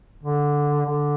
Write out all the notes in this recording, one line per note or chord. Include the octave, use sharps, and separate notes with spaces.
D3
D3